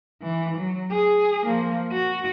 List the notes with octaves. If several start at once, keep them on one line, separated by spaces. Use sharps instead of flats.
E3
F#3
G#4
F3 A#3
F#4